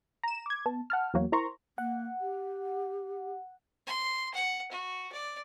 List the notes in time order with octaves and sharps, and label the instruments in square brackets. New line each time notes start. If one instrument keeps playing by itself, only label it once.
[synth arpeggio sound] A#5 E7
D6 G#6
B3 A5
F#5 A5 F6
E2 F#3 A#3 F#4 C#5
E4 A#4 C5 A#5 C6 C#6
[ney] A#3 [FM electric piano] F#5
[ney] G4
[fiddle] C6
F#5
F#4
D5